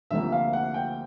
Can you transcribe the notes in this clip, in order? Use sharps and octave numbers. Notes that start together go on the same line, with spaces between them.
D2 C3 F3 A#3 E5
F5
F#5
G5